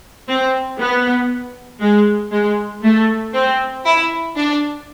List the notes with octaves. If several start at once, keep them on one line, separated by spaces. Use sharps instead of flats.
C4
B3
G#3
G#3
A3
C4
E4
D4